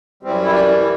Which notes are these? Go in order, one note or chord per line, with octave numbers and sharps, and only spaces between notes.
F#2 E3 G3 C4
E4
D4
E4